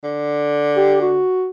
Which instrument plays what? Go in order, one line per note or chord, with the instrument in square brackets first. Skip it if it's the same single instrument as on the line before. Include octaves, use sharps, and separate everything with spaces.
[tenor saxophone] D3
[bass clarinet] G4
F#4